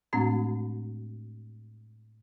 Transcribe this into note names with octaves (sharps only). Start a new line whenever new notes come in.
A2 G#3 A3 C4 D4 F#4